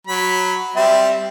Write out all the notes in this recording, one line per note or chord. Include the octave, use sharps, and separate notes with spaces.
F#3 B5
G3 C4 E5